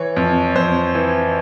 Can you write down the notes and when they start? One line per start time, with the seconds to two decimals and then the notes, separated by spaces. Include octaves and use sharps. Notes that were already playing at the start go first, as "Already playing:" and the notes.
Already playing: E3 C#5
0.16 F2
0.55 F2 C5
0.95 E3